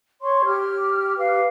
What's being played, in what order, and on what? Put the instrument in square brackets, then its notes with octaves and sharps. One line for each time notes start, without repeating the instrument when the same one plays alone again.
[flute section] C#5 C6 C#6
G4 F6
G4 B4 F5